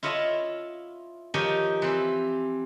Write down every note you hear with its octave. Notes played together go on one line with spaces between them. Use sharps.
E4 F4 C#5 D#5 E5 A5
D#3 F3 D#4 G4 C#5 G#5
E3 C4 G4